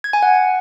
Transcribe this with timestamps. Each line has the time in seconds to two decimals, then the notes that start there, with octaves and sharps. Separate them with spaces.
0.04 G#6
0.13 G#5
0.23 F#5